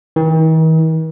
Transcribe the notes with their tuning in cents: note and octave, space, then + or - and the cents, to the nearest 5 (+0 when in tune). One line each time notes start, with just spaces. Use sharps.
D#3 +45